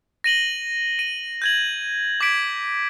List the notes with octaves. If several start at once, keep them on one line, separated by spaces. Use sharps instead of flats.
A#6 D#7 F#7 G7
D#7
G6 G#6 F#7
D6 G#6 B6 D7